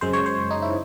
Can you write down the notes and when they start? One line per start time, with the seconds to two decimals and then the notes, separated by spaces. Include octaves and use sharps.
0.01 F#2 C#3 G#3 C5
0.13 C#5
0.26 C5
0.51 D#4
0.62 E4